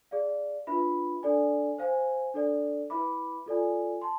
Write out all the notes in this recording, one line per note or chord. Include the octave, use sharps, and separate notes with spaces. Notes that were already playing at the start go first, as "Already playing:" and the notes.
G#4 D5 F5
D4 F4 B4 E5 B5
D4 A4 D5 G#5
C5 F5 G#5
D4 A4 D5
E4 B4 E5 B5 D6
F4 A4 D5 G#5
A5 C6